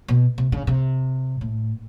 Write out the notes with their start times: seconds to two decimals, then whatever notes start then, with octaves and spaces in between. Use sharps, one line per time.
0.08 B2
0.38 C3
0.52 C#3
0.67 C3
1.41 A2